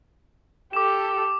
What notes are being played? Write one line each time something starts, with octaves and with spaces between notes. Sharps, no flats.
G4 A4 D6 E7